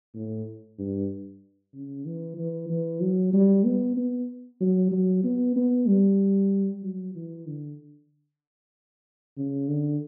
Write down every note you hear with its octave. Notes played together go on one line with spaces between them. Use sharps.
A2
G2
C#3
E3
E3
E3
F#3
G3
B3
B3
F#3
F#3
B3
B3
G3
F#3
E3
D3
C#3
D3